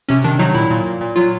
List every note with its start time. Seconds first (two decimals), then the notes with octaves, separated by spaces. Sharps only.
0.08 C3 C#4
0.24 D#3 D4
0.39 F#3 D#4
0.54 A#2 E4
0.70 A#2
0.86 A#2
1.01 A#2
1.16 F#3 F4